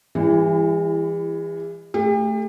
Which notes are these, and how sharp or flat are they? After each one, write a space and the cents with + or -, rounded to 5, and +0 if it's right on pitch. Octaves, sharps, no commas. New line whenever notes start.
E3 +15 G#3 -45 E4 +30
A3 +0 G4 +40